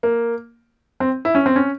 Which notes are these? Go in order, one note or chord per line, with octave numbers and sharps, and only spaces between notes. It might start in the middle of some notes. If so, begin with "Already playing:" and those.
A#3
C4
E4
C#4
C4
C#4